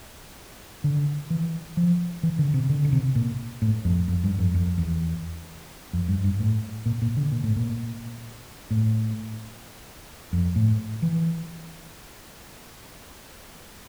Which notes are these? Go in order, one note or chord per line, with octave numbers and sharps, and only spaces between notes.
D3
E3
F3
E3
D3
C3
D3
D3
C3
A#2
A2
F2
F2
G2
F2
F2
E2
F2
G2
G2
A2
A#2
A#2
D3
A#2
A2
A#2
A2
F2
A2
E3